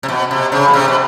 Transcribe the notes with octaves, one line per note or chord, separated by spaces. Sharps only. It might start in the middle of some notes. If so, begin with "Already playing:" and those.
C3
B2
C3
C#3
B2
C3
B2